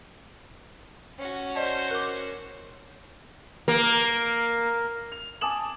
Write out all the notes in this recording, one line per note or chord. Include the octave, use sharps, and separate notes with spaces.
C#4 F#4
C5 D5 D#5 A5
A#4 D6
A#3
F7
G#5 A5 D6 D#6 E7 F#7